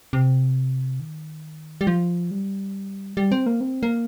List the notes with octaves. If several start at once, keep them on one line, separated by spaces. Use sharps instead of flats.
C3
D#3
G3
F3
G3
G3
C4
A#3
C4
A#3